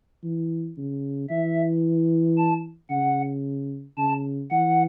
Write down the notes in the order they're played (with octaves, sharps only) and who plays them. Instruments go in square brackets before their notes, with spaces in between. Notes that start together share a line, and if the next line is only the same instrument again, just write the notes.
[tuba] E3
C#3
[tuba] E3 [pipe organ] E5
[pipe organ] A5
[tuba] C#3 [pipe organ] F#5
[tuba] C#3 [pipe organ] A5
[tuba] E3 [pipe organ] F#5